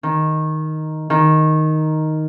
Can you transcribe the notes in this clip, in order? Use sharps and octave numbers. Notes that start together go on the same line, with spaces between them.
D#3
D#3